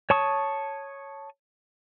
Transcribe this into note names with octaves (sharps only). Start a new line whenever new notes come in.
C#5 A5 C#6 D#6